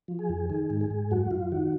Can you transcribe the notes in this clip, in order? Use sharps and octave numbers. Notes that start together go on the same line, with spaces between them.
F3
G#4
F2
D#3 G#4
G#2
G#4
G#2
F#2 F#4
F#2 F4
D#3 F#4